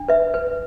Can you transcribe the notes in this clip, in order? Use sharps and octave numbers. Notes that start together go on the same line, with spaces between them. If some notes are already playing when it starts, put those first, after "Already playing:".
Already playing: D4
B4 E5
B4